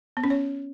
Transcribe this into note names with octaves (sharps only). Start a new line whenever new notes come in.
B3
C#4
C#5